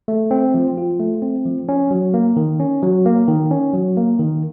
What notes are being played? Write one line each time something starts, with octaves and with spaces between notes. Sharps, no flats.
A3
C4
F3
F4
A3
C4
F3
C#4
F#3
A#3
D#3
C#4
F#3
A#3
D#3
C#4
F#3
A#3
D#3